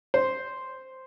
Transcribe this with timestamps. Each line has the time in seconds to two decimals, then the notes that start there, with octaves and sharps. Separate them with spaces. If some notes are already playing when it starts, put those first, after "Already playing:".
0.14 C5